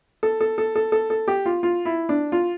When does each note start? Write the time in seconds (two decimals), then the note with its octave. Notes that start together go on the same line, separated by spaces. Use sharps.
0.23 A4
0.41 A4
0.58 A4
0.76 A4
0.92 A4
1.10 A4
1.28 G4
1.46 F4
1.63 F4
1.85 E4
2.09 D4
2.32 F4